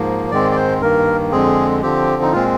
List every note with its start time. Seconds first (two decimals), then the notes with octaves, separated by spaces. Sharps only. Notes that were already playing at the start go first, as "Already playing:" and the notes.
Already playing: G#2 F3 A#3
0.31 G#2 D#3 G#3 C4 D5
0.52 D5
0.56 C5
0.81 G2 D#3 A#3 A#4
1.32 F2 D3 G#3 C4 G#4
1.82 D3 F3 C4 G4
2.22 D#4
2.32 A#2 G#3 C4 F4